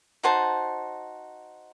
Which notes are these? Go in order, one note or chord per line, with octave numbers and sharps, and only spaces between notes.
D#4 F#4 C5 A5